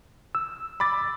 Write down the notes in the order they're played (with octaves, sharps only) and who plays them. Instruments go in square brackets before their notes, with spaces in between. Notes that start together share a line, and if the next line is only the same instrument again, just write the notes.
[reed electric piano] E6
[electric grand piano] B5 D6 A6